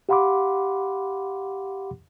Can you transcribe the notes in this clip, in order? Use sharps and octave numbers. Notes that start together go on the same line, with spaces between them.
G4 F5 F#5 B5 C6 D6